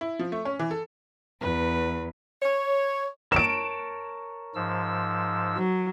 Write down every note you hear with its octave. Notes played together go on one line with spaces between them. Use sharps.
E4
F3
A3
C#4
E3
A4
E2 B4
C#5
A#4 C#5 A5 D7 E7
G#2 F3 E6
F#3